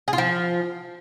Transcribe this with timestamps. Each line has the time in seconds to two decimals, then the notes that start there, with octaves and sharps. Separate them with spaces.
0.08 G#4
0.13 F4
0.18 F3